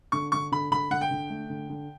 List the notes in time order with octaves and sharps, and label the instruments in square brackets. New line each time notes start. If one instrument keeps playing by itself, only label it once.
[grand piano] D3 [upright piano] C#6
[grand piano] D3 [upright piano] C#6
[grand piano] D3 [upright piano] B5
[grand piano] D3 [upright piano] B5
[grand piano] D3 [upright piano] F#5
[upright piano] G5
[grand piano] D3
A3
D3
D3